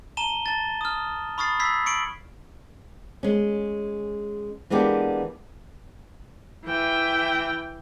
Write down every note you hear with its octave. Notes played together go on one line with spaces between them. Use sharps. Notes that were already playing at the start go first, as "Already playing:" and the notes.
A5 A#5 D#7 E7 G7
A5 A6
D#6 F6
B5 C#6 D#6 F6 A6 C7
B5 E6 G#6 B6 C7
C#6 C#7 D7 F#7
G#3 C#4
E3 G#3 A#3 B3 D4 G4
E3 G5